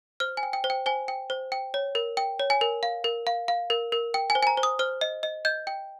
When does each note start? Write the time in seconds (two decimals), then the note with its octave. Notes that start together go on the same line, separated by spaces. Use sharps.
0.20 C5 F6
0.37 G#5
0.43 G5
0.53 G5
0.64 C5
0.70 G5
0.86 C5 G#5
1.08 G5
1.30 C5
1.52 G5
1.74 C#5
1.95 A#4
2.17 G5
2.40 C#5
2.50 G#5
2.61 A#4
2.83 F5
3.04 A#4
3.27 F5
3.48 F5
3.70 A#4
3.92 A#4
4.14 G5
4.30 G#5
4.35 C5
4.43 G#5
4.47 A#5
4.57 C5
4.63 D#6
4.79 C5 F6
5.01 D#5
5.23 D#5
5.45 D#5 G6
5.67 G5